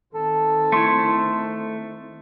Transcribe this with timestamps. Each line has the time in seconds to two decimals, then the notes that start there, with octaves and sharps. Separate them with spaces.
0.15 D#3 C4 A4
0.72 A3 E4 C6